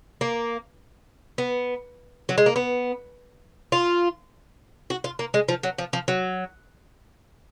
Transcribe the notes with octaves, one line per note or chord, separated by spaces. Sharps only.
A#3
B3
F#3
G#3
A#3
B3
F4
F#4
F4
A#3
G#3
F3
F#3
F3
F3
F#3